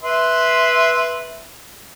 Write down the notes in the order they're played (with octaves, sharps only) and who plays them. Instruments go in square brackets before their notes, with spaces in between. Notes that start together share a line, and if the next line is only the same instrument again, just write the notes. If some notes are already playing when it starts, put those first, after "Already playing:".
[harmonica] B4 E5 C6